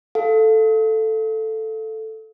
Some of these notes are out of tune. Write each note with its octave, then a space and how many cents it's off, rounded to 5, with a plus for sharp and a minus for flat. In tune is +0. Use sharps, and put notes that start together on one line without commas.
A4 +0 F5 +0